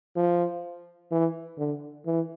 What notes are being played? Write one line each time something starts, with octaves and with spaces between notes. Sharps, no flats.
F3
E3
D3
E3